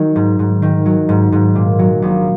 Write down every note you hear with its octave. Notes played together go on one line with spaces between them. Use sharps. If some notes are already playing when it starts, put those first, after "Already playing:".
Already playing: D#3 F#3
G#2
G#2
D#3
F#3
G#2
G#2
A#2
F#3
A#1